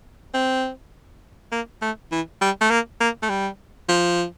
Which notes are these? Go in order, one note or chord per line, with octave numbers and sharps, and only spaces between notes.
C4
A#3
A3
E3
G3
A3
A#3
A#3
A3
G3
F3